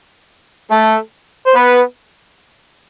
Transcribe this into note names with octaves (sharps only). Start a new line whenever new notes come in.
A3 A4
C5
B3 B4